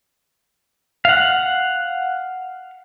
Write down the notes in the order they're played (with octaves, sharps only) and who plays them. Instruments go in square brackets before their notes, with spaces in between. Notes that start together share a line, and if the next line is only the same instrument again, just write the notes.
[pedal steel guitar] F5 F#5